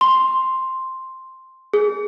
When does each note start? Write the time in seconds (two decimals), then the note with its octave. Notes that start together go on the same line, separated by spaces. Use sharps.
0.01 C6
1.74 G#4